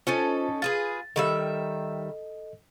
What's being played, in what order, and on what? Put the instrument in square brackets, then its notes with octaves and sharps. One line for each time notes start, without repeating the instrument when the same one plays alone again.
[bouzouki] C#4 D#4 A4 [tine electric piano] F4 C5 D#5
[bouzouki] F4 G#4 B4 [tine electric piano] A6
[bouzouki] D#3 G3 E5 [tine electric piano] A4 D#5